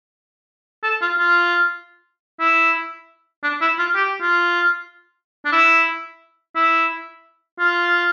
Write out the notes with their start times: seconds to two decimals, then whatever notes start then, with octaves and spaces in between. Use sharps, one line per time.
0.83 A4
1.02 F4
1.19 F4
2.40 E4
3.43 D4
3.61 E4
3.79 F4
3.95 G4
4.22 F4
5.45 D4
5.52 E4
6.56 E4
7.59 F4